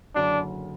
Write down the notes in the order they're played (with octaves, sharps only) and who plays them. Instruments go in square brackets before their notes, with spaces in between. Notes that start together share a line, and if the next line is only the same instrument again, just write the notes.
[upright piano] F#1 F#2 D3 [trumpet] D4